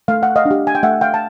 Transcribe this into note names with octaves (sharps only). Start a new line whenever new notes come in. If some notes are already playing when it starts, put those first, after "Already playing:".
A3 F5
F#5
D#5 F5
D4
G4
G#5
G5
A3 E5 F#5
F5 G5
A5